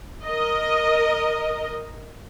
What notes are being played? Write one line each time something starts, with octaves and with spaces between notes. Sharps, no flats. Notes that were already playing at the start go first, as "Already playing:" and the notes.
A#4 D#5